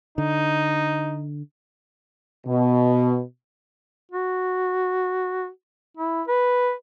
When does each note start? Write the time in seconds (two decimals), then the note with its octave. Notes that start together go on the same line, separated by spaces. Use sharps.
0.18 D3 D#4
2.46 B2
4.12 F#4
5.97 E4
6.27 B4